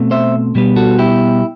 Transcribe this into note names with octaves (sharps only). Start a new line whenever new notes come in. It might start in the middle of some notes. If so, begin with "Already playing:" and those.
Already playing: B2 A3 C4
C5 E5
B2 G3 B3
F#4 A4
E4 G4